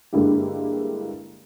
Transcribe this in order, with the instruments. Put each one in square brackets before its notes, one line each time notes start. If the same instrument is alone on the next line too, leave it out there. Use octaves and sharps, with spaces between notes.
[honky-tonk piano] G2 D3 G#3 A#3 E4 G4